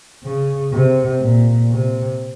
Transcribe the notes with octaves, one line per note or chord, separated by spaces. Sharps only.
C#3
C3
A#2
C3